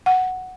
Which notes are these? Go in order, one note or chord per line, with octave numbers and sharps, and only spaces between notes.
F#5